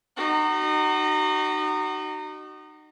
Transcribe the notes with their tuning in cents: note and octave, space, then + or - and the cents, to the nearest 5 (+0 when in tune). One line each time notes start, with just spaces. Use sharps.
D#4 -30 F#4 +35